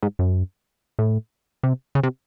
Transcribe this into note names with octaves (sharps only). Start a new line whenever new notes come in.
G#2
F#2
A2
C3
C#3
C3